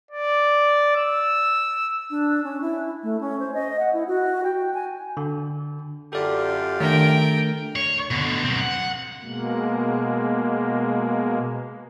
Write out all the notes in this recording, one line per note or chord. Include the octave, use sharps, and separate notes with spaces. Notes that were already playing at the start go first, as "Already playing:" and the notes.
D5
E6
D4
C#4
E4
A3
C#4
C5
D#5
F#5
E4
F#4
G5
G#5
D3
F#2 F4 G4 A4 D5
D#3 A3 D4 A#4 G5
C#5
B2 D3
F#3 C4
F#5
B2 G#3 A#3